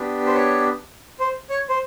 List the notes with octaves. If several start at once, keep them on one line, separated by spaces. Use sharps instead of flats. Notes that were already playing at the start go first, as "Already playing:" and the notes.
Already playing: B3 D4 G4
C5
C#5
C5
C#5
C5